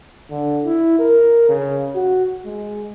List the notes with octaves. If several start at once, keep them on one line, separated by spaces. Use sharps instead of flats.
D3
E4
A#4
C#3
F#4
G#3